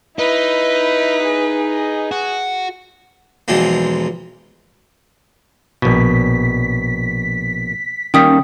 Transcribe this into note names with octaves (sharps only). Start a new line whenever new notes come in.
D#4 E4 B4
G#4
F#4
B1 E2 F3 G#3 A#3
A#1 B2 B6
D#3 G3 A#3 C#4 G5 D#6 B6